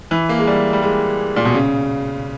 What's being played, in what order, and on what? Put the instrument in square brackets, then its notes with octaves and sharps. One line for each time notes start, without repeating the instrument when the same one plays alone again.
[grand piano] E3
A#3
G#3
G3
G3
G#3
A#2
B2
C#3